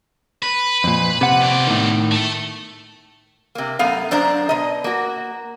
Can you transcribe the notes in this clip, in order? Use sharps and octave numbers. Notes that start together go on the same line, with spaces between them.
B4
F2 A#2
C3 F#5
B2 D5
A2 D#3
A3 A4
C3 A#3
F#2 A3 B3 F5
F#2 D4 C5 A#5
B2 D#5
A#3 F#4